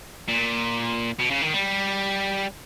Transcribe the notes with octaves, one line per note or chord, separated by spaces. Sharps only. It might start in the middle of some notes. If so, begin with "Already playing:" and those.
A#2
B2
C#3
D#3
G3